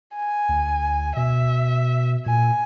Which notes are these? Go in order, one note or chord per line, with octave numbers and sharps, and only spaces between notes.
G#5
D2
B2 E5
A#2 G#5